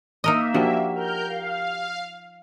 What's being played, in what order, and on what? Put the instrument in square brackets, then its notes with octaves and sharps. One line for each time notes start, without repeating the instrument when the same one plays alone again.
[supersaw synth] A#3 E5 [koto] D#4 A#4 D#5
[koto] F3 [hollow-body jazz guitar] D4 F#4 G4
[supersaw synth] A#4 F6 G6
F5